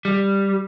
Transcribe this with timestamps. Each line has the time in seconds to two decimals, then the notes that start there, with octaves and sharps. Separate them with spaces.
0.05 G3